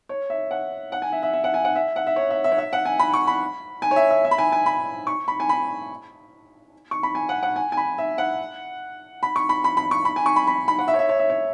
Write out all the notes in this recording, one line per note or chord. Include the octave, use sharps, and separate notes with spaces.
C#5
E5
F#5
F#5
G#5
E5
E5
E5
F#5
G#5
F#5
E5
F#5
E5
C#5
E5
E5
C#5
E5
F#5
G#5
B5
C#6
B5
G#5
C#5
E5
E5
E5
B5
G#5
G#5
B5
C#6
B5
G#5
B5
C#6
B5
G#5
F#5
F#5
G#5
G#5
B5
E5
F#5
B5
C#6
B5
B5
B5
C#6
B5
G#5
C#6
B5
B5
B5
F#5
E5
C#5
E5
C#5
E5
C#5